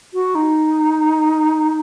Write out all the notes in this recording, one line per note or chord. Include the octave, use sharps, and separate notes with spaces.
F#4
D#4